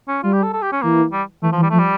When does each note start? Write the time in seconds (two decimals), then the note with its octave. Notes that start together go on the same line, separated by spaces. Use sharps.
0.08 C#4
0.23 G3 F4
0.33 G4
0.43 A4
0.53 A4
0.62 G4
0.72 C#4
0.82 E3 A#3
1.12 G3
1.42 E3 A3
1.53 F3
1.58 E3
1.63 G3
1.71 F3 A3
1.79 G3